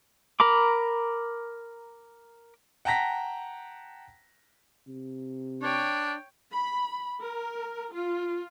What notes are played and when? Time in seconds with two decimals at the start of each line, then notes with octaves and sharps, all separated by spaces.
0.40 A#4 A#5 B5 D6
2.85 F#5 G5 A5 A#5 A#6 B6
4.88 C3
5.62 D4 C#5 G5
6.52 B5
7.18 A#4
7.91 F4